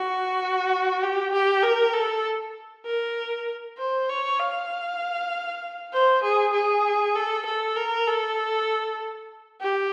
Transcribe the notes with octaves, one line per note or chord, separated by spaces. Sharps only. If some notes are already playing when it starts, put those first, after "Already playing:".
Already playing: F#4
G4
G4
A#4
A4
A#4
C5
C#5
F5
C5
G#4
G#4
A4
A4
A#4
A4
G4